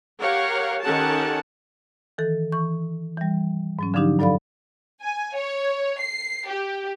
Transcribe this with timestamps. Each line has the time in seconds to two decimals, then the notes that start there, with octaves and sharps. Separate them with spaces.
0.21 G4 A#4 C#5 F5 F#5
0.82 D#3 C#4 G4 A4 F#5 A5
2.18 D#3 E3 A4
2.52 E3 C#6
3.17 E3 G3
3.79 G#2 F#3 C#4
3.94 D3 F3 F#3 D4 D#4 G4
4.19 G2 F#3 A4 D5 F5 B5
5.02 G#5
5.35 C#5
6.00 C7
6.48 G4